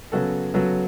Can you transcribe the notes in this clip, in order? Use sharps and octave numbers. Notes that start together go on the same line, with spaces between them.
C#3 F#3 B3 F#4 A4
C#3 F#3 B3 F#4 A4